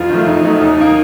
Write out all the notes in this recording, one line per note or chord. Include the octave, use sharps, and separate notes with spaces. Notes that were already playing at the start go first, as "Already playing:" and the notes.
Already playing: F2 F4
D#3 F#3 A3
F2 D#4
D#3 F#3 A3
D#2
D#3 A#3